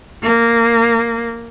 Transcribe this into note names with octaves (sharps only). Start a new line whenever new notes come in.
A#3